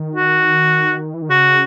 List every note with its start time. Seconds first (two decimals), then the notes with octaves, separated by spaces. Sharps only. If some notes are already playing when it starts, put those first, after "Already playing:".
Already playing: D#3
0.15 F#4
1.14 E3
1.22 D#3
1.29 C#3 F#4